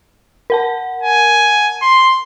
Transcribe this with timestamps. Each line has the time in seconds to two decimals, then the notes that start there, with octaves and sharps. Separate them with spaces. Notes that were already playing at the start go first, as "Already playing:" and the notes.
0.50 A#4 F#5 A5
1.03 G#5
1.82 C6